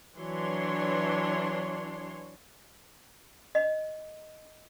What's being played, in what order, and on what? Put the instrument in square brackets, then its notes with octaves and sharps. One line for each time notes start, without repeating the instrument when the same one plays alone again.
[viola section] E3 F#3 D4 C#5 C6
[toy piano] D#5